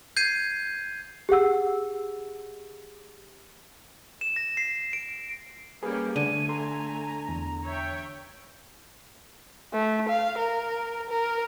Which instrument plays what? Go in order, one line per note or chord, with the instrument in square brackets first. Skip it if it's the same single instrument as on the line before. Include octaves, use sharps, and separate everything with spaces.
[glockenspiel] G6 G#6 C7 D#7
[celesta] G4 G#4 F#5 E6
[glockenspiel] E7
A#6
C7
D7
[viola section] G3 A#3 C#4 [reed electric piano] G#4 B4
[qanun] D3 [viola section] A3 G#5 [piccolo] D#7
[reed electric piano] A4 C6 [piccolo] A#5
[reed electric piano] E2
[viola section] C#5 E5 G5
[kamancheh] A3
F5
A#4
A#4